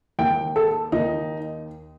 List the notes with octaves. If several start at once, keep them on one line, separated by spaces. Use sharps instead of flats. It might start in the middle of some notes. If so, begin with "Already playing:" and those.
D#2 D#3 G5
A4
D#2 D#3 D#4